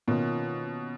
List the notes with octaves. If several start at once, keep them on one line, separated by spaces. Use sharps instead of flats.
B2 D#3 A#3 C#4 F4